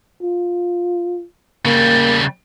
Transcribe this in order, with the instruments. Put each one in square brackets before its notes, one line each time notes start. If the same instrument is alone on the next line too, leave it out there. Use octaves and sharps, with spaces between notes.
[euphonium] F4
[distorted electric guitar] C#3 G3 [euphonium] A#3